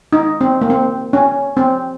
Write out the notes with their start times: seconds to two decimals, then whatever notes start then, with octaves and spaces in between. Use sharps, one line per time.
0.13 D#4
0.41 C4
0.61 A#3
0.70 C4
1.13 C#4
1.57 C4